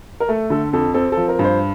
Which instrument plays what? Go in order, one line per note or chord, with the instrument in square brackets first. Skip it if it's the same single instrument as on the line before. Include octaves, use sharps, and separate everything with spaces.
[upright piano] A#4
A3 A4
D3 A4
F2 A4
C4 A4
F3 A4
A#4
G2
C5